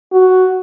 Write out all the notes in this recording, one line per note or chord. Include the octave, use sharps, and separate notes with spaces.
F#4